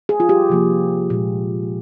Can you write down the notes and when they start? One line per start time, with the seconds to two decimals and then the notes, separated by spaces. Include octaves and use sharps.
0.09 G#4
0.20 F4
0.29 G4
0.49 C3 F3 A#3
1.10 A#2 G#3